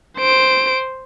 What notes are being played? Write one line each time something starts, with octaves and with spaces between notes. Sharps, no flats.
C5 D7